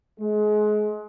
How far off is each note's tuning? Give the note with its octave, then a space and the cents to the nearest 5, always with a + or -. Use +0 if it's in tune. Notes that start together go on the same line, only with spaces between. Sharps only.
G#3 +30